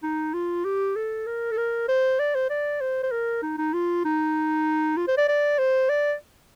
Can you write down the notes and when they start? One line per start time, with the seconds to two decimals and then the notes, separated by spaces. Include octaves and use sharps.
0.03 D#4
0.34 F4
0.64 G4
0.96 A4
1.26 A#4
1.51 A4
1.57 A#4
1.88 C5
2.19 D5
2.35 C5
2.50 D5
2.81 C5
3.03 C5
3.11 A#4
3.42 D#4
3.58 D#4
3.73 F4
4.05 D#4
4.97 F4
5.07 C5
5.17 D5
5.28 D5
5.58 C5
5.89 D5